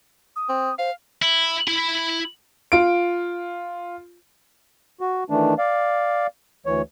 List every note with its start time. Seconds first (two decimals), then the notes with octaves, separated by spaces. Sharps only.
0.36 D#6
0.49 C4
0.79 C5 F5
1.22 E4
1.68 E4 B5
2.72 F4 D7
5.01 F#4
5.30 D#3 E3 A3 D4
5.58 D5 F5
6.66 D2 E3 C#5